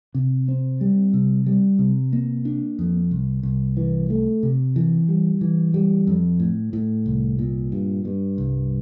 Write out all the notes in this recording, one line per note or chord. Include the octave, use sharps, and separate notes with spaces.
C3
C4
G3
C3
G3
C3
A#3
D4
F2
C2
C2
E3
A3
C3
E3
G3
E3
G3
F2
A2
A2
C2
A#2
G2
G2
C2